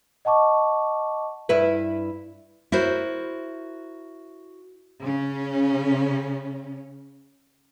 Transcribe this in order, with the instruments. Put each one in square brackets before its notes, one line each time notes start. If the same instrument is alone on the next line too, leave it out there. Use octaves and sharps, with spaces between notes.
[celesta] D#5 F#5 A5 C#6 D6
[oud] G2 E4 B4
[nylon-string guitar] E4 F#4 A#4 C5
[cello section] C#3 C#4